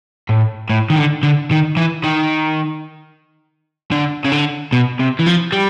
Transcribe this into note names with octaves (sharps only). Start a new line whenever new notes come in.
A2
A2
D#3
D3
D3
D#3
E3
D#3
D3
C#3
D3
B2
C3
E3
F3
G3